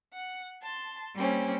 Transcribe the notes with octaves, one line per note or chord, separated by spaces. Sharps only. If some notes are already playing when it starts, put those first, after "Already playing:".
F#5
A5 C6
G3 A#3 C4 C#4